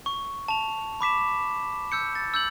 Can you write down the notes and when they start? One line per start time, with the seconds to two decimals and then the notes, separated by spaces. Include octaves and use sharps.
0.06 C#6
0.48 A5 F7
1.01 B5 D6 B6 E7
1.92 E6 G6 C#7
2.15 A6
2.34 E6 G6 F#7